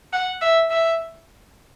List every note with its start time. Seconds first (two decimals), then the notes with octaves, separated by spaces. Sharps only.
0.13 F#5
0.42 E5
0.71 E5